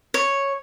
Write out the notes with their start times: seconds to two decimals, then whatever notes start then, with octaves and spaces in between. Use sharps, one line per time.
0.14 C#5